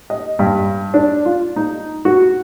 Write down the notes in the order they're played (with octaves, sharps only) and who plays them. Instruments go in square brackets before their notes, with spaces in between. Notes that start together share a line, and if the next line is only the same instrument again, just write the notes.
[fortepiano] D#5
G2
D4
F4
D#4
F#4